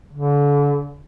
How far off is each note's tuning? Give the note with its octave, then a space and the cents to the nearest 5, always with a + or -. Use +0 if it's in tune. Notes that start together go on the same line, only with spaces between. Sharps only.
D3 -35